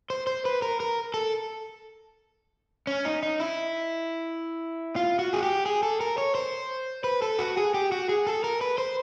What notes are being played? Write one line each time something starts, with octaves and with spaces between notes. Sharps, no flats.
C5
C5
B4
A#4
A#4
A4
C#4
D#4
D#4
E4
F4
F#4
G#4
G4
G#4
A4
A#4
C#5
C5
B4
A4
F#4
G#4
G4
F#4
G#4
A4
A#4
B4
C5